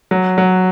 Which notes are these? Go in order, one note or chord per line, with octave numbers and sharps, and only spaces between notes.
F#3
F#3